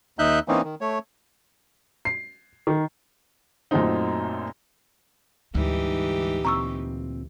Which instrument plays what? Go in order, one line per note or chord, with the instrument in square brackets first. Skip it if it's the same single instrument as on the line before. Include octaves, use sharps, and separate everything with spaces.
[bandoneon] D#2 D#4 E5 F#6 G6
E3 A#3 C4 C#4 D#4
D#3
A3 C#5
[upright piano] C7
D#3
F#2 A#2 F#3 A3 C4 D#4
[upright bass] D2 [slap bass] G#2 G3 [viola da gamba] E3 D#4 G4
[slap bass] A#2 C4 [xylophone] A#5 C#6 E6